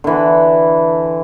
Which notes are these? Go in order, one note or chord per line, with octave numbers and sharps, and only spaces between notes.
D3 E3